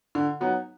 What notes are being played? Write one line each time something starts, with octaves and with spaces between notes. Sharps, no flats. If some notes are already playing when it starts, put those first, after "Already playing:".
D3
F#3 B3 D#4